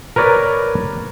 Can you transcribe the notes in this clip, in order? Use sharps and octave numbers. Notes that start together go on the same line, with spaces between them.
A#4 B4 C#5 D5